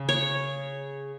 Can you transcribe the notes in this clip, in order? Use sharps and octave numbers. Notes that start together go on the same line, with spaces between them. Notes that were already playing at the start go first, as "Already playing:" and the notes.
Already playing: C#3
C#5